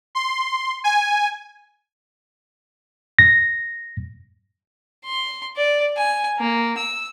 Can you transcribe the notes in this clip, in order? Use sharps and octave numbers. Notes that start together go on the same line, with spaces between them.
C6
G#5
A#6
C6
D5
G#5
A#3
E6